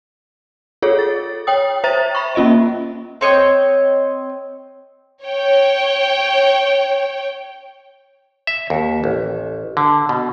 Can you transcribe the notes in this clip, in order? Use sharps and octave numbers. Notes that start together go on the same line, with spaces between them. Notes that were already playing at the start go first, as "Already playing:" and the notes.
F4 G#4 A4 C#5
A6
C#5 G5 D#6
C5 E5 A#5 A6
B5 C#6
A#3 C#4 F4 D#5 E5
C4 C#5 D#5 G5
C#5 G5
E5
D#2
A1
D3
B2